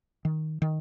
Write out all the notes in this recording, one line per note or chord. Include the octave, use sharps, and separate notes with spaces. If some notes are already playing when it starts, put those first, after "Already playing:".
D#3
D#3